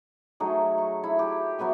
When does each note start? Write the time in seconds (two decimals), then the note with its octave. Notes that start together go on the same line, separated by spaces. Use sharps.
0.40 F#3 A3 D#4 G#4
0.78 C#6
1.04 E4
1.19 G4
1.59 F#3 B3 E5 G#5